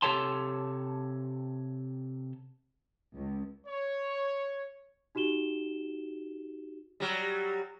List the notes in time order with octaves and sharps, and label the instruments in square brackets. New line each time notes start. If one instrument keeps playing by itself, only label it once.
[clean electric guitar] C3 G4 A4 C#5 A5 C6
[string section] C#2
[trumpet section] C#5
[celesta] D#4 F#4 G4 E7 G7
[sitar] F#3 G3